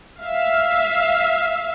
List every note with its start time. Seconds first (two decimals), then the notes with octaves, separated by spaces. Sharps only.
0.20 E5 F5